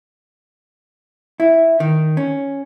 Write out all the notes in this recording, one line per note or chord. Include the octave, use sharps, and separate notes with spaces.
E4
D#3
C#4